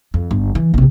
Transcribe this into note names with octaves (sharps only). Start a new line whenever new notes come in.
F2
G1
E3
A#1 C3